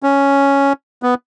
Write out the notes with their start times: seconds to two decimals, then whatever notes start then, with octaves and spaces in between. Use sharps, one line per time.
0.03 C#4
1.03 B3